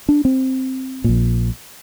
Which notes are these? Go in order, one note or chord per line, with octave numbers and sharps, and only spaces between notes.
D4
C4
A#1 A#2